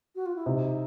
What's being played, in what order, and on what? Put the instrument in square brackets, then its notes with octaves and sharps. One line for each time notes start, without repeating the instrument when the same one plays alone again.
[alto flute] F#4
F4
E4
[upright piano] C3 [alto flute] D#4